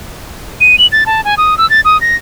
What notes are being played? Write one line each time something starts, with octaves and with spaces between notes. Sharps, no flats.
D#7
F#7
A6
A5
G#5
D#6
E6
A6
D#6
A#6